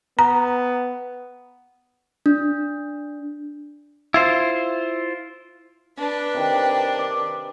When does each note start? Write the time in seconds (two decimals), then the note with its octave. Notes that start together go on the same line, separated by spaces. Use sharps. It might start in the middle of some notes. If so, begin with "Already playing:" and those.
0.19 B3 A#5
2.26 D4
4.14 E4 F4 C5
5.97 D4 B4
6.34 C3 D#3
6.99 D5